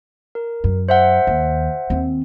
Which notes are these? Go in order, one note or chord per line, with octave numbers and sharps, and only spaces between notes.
A#4
F#2
C5 E5 F#5
D#2
D#2 C4